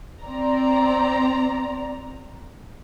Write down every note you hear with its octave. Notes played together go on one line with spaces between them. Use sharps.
C4 D5 A#5